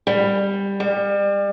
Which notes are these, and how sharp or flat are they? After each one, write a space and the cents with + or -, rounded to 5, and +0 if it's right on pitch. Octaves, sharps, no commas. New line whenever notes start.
G3 +15
G3 +35